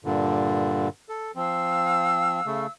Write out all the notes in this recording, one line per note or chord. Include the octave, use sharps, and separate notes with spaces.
G2 A#2 D3
A4
F3 C4 F5 E6
C#3 A3